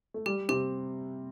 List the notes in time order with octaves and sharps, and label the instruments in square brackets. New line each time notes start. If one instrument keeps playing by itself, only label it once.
[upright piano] A3
[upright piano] G3 [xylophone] G4
[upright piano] C3 C4 [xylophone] G4